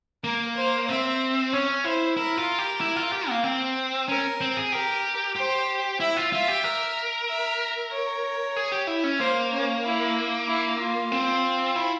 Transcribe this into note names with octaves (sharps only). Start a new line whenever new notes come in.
A#3 A#4
C5
C4 E5
C#4 C#5
E4 C5
E4 A#4
F4
G4
E4
F4
G4
A#3
C4
C#4 A#4
C4
G#4
G4 A#4
G4 C5
E4 E5
F4
F4 E5
G4
A#4
E5
C#5
G#4
G4
E4
C#4
A#3 C5
C#4
E4
E4
F4
C4
E4